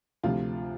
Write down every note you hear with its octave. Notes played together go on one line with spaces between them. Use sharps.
D2 C3 F3 F4